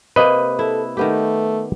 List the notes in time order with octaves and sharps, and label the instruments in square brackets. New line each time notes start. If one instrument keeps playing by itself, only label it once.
[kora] C3 A#3 [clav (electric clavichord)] B4 D#5
[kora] E4 [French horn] A4
[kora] D#3 B3 G4 [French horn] A3